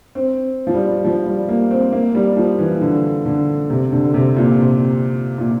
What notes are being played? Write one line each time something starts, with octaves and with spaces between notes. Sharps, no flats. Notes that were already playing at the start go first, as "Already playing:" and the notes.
C4
F3
G3
F3
G3
A#3
C4
A#3
G3
F3
E3
D3
D3
C3
D3
C3
A#2
C3
A#2